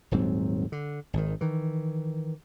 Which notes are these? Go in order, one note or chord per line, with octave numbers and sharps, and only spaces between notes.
D#1 G#2 F#3 C4
D3
G#1 D#3
D#3 E3